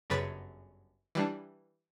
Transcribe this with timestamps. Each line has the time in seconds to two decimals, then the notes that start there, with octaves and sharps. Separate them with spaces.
0.10 G1 F#2 C#3 B4 A6 B6
1.15 E3 G3 D4